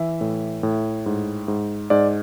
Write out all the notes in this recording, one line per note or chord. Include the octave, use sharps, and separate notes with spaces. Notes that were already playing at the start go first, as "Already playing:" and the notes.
Already playing: E3 E5
A2
A2
G#2
G#2
G#2 D5